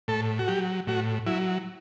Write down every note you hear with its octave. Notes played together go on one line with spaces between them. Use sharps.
A2 A4
F#4
F#3 G4
A2 F#4
F#3 E4